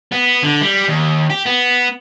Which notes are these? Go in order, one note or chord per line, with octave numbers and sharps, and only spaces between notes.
B3
D3
G3
D#2
G4
B3